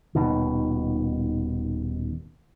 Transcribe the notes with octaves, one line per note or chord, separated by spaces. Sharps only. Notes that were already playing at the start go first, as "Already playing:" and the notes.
D#1 B2 D#3